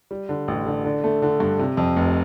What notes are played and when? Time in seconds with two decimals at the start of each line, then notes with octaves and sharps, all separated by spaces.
0.11 G3
0.29 D3
0.48 A1
0.66 D3
0.85 D3
1.04 A3
1.22 D3
1.40 G2
1.59 C3
1.77 F2
1.96 F1